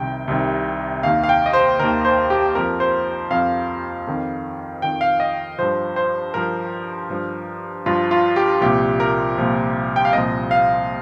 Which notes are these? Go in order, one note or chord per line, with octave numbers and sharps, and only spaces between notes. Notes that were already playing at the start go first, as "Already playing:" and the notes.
Already playing: C2 C3 D#3 G5
C2 C3 D#3
D#2 D#3 F5
F5
G5
D#5
C5
D#2 D#3 A#4
C5
G4
F2 F3 A#4
C5
F2 F3 F5
F2 D#3
F2 D#3 G5
F5
D#5
G2 F3 C5
C5
G2 F3 A#4
G2 F3
G2 F3 F4
F4
G4
C2 A#2 F3 G4
A#4
C2 A#2 F3
G5
F5
C2 A#2 F3 D#5
F5